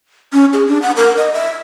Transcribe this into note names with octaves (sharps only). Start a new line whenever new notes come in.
C#4
G#4
D4
F#5
A#4
D#5
E5